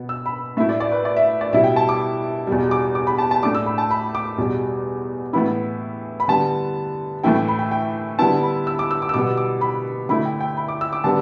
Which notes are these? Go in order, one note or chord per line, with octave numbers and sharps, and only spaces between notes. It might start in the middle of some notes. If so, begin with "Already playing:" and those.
Already playing: B2 B3
E6
B5
A2 A3 E4 E5
D5
D5
B4
D5
E5
D5
B2 G3 E4 E5
G5
A5
D6
E2 B2 G3
D6
D6
B5
A5
A5
A2 A3 D4 D6
E6
B5
A5
B5
D6
E2 B2 G3
A2 E3 B3 E4 B5
B5
D3 G3 B3 A5
A2 E3 A3 E4 G5
G5
B5
G5
G5
D3 G3 B3 E4 A5
B5
E6
D6
E6
D6
E6
B2 G3 B3 D6
D6
B5
D3 A3 E4 B5
G5
G5
B5
D6
E6
D6
D3 G3 B3 D4 A5